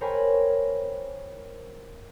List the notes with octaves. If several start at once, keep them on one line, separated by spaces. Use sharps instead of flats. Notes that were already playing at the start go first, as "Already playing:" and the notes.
A#4 C5 C#5 G5 G#5 B5